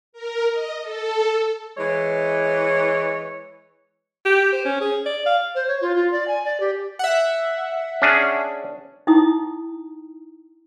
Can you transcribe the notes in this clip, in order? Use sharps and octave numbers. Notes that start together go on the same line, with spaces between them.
A#4
D#5
A4
E3 G#3 C#5
G4
C5
C#4
G#4
D5
F5
C5
C#5
F4
F4
D5
G#5
D5
G4
E5 F#5
C#4 D4 G#4
D#4 E4 G5 A#5 D#6